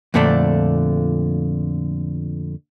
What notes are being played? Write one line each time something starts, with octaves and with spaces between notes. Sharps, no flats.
F2 A#2 D3 A3 C4 D4